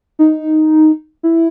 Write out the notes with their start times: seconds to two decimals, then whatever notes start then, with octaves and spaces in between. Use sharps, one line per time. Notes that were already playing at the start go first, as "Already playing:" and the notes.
0.19 D#4
1.23 E4